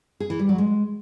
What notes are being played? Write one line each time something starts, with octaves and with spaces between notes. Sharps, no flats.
G#4
E3
G3
F#3
G#3